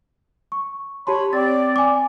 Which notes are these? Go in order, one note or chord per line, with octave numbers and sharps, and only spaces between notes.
C#6
G4 C#5 A5 B5 C6
C4 D5 A6
G#5 D6